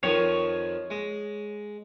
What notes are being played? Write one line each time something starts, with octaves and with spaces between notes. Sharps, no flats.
F2 D#3 F3 C#5
G#3